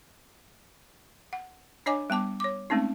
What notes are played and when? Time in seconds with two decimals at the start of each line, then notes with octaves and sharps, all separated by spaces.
1.33 F#5
1.86 D4 C#5 D#5 G#5 D6
2.10 G3 B3 A5 D6
2.40 C#5 D6
2.70 G#3 A3 C4 C#4 D#4